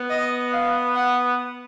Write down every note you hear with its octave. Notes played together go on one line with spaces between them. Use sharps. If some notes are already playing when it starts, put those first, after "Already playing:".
Already playing: B3
D#5
F5
F#5